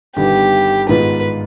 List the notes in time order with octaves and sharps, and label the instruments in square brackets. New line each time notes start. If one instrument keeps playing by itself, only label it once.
[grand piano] G1 G2 D#3 B3 [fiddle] G4
[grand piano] G#2 D#3 G#3 B3 F4 [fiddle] B4